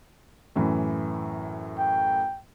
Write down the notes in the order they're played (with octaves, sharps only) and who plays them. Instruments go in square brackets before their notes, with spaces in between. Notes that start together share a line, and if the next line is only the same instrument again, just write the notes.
[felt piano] F#2 A2 E3
[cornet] G5